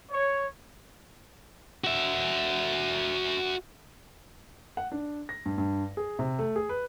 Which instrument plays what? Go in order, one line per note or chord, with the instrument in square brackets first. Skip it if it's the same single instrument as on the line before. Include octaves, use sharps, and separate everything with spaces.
[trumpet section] C#5
[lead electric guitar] F#4 E5
[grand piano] F#5
D4
A#6
G2
G2
G#4
C3
A3
G#4
B4